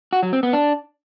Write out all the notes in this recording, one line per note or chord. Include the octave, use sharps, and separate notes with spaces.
F#4
F#3
C4
B3
D4